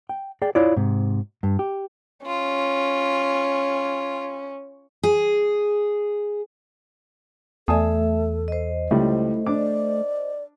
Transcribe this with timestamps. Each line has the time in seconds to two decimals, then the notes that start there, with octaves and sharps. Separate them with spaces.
0.09 G5
0.42 G#4 D5 G5
0.55 E4 F4 C#5 D5
0.76 G#2 C3
1.43 G2
1.59 G4
2.26 C#4 F4
5.04 G#4
7.68 E2 A3 A4 E5 G#5 A5 D#6
8.48 C5 D#5
8.91 C#2 G3 A3 E4
9.46 D4 D5 D6